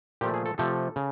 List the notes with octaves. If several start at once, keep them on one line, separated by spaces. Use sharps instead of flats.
A#2 F3 A3 G4
G#4
A4
C3 F3 A3 A4
C#3